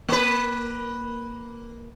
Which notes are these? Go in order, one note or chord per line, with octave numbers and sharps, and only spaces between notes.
A#3 B4